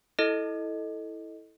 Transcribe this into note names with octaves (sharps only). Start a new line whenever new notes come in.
E4 A4 D#5